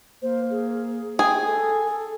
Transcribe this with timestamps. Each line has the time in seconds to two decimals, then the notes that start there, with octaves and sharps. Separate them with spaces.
0.22 A#3 C5
0.50 G#4
1.19 G#4 G5
1.46 A4 G#5
1.86 A4